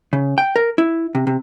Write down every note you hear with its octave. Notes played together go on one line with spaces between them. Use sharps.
C#3
G5
A#4
E4
C3
C3